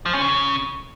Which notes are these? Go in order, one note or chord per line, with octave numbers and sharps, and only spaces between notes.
F3
C#4
C#3